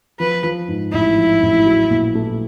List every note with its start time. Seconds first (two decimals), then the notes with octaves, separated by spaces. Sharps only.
0.20 F3 B4
0.44 F3
0.68 G#2
0.92 A1 E4
1.17 F3
1.42 A1
1.66 F#3
1.90 A#2
2.15 A3